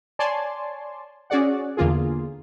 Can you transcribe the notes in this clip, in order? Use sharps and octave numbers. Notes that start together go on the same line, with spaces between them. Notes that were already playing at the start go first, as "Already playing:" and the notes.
C#5 D5 G#5 A5 C6
C#4 F#4 G#4 D5 F#5
E2 D3 A#3 F4 G#4